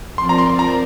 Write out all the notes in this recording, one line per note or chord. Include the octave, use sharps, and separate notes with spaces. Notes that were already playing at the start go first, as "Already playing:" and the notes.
F3 C4 A#4 D5 C6
A#5
C6
A#5